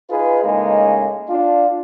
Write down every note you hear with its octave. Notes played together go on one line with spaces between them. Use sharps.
D#4 F4 G#4 B4
A2 C#3 G#3 A#3 C#4 D#4
D4 F4